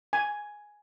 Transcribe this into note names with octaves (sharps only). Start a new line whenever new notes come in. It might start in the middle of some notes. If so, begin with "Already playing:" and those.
G#5